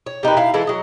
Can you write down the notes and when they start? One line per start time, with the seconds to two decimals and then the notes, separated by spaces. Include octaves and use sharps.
0.06 C#5
0.23 G3 D#4 A#4 B4
0.37 E4 F5
0.54 E3 G#3 E4 A4
0.67 F#3 D#5